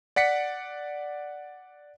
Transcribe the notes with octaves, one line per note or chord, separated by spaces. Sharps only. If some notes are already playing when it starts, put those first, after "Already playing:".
D5 F#5 B6 C#7